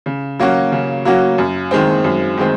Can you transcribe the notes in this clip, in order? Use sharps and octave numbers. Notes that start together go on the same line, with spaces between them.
C#3
F#3 A#3 C#4 F#4
C#3
F#3 A#3 C#4 F#4
F#2
D#3 G#3 C4
F#2
D#3 G#3 C4